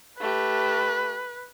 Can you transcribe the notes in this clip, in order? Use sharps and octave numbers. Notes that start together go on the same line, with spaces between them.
A3 G4 B4